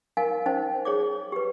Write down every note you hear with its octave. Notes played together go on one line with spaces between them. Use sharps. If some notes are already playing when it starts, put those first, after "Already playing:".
D#4 A#4 F5 G#5
C#4 D#4 C5
G#4 C#5 D6
G4 B4